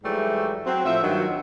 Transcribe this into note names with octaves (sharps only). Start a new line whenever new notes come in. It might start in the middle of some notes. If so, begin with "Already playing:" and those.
G#2 E3 F#3 G3 A3
F#3 C4
A2 F3 C5 E5
G2 D#3 F#3